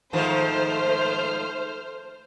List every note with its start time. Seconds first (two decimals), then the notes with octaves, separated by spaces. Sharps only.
0.13 G#2 D#3 F3 A3 C5 F6